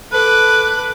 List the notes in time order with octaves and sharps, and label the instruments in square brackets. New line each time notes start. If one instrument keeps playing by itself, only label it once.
[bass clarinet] A4 [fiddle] B4 D6 [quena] F#6